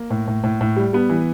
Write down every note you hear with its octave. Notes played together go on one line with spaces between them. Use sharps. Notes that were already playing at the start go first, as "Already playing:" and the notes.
Already playing: A#3
A2
A2
A2
A2
G3
G3 B3
E3